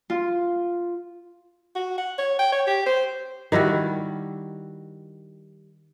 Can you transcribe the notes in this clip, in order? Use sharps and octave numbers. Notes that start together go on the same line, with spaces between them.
F4
F#4
F#5
C#5
G5
C#5
G4
C5
D#3 G3 E4 F#4